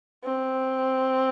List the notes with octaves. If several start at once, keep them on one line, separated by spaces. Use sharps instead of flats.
C4